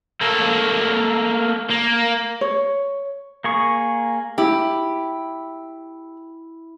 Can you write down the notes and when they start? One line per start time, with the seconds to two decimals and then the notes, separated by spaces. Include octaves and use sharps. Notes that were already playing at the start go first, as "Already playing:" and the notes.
0.21 A3 A#3
1.70 A#3
2.41 C#5
3.44 A#3 G#4 C#6
4.38 E4 G4